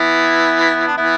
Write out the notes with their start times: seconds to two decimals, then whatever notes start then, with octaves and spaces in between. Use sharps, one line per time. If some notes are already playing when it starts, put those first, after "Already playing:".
Already playing: E3 B3 E4
0.87 D4
0.98 E3 B3 E4